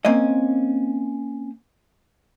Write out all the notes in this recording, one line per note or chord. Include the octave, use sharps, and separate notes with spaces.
A#3 C4 C#4 D#5